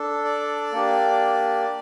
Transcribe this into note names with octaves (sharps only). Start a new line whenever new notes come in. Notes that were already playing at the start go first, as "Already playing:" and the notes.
Already playing: D4 A4
D5
A#3 D4 G4